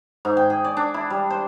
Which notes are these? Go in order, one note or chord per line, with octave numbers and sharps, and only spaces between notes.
G#2
G5
G#4
D5
D4
E4
G3
C5